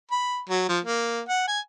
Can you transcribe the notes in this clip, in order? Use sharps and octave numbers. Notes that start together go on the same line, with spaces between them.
B5
F#3
F3
A#3
F#5
G#5